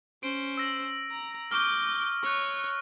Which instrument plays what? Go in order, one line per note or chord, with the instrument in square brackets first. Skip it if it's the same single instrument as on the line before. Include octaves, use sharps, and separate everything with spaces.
[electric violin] C#4 C5 [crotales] D7
[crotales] E6 A#6
[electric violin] A#5
[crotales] C#6 F6 [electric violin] D6 G6
[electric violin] C#5 [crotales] C#6 F#6